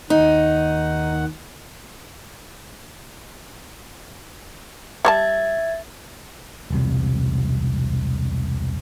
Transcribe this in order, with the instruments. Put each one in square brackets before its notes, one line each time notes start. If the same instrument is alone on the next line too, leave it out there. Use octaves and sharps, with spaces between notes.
[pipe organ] D#2 D#3 F#5 [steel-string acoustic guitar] D#4
[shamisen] G3 C#5 A5 [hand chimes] E5 G#6 A6
[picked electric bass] E1 C2 C3